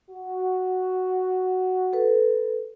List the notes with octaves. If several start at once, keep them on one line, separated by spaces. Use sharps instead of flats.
F#4
A4 B4